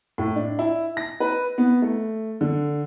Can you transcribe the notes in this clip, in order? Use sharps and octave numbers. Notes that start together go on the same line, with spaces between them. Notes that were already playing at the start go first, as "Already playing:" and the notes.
A2
D4
E4
A#6
B4
B3
A3
D3